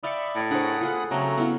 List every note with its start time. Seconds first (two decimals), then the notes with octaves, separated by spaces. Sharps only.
0.03 D5 E5 F5 G5 A5 B5 D#6 C#7
0.35 A2
0.51 D4 G#4 A#4 C5 C#5 F#5 B5 D#6
0.81 F4 G#4 A4 F#6
1.11 C#3 F#3 A3 C4 A#5
1.37 B3 E4 A4 F5 F#5